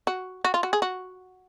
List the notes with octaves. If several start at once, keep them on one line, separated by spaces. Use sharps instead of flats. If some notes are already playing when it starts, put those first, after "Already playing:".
F#4
F#4
F4
F#4
G#4
F#4